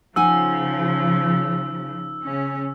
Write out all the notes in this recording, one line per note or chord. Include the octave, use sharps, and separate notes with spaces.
C#3 F3 D#4 F#5 G#5 E6
C#3 C#4